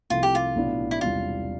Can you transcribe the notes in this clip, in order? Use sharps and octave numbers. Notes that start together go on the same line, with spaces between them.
C2 C3 F3 A3 F4
G4
F4
B1 A2 E3 B3 D4
E4
E1 E2 C3 G3 D4 F4